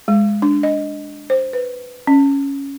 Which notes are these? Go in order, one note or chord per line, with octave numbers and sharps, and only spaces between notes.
G#3
D4
D#5
C5
B4
C#4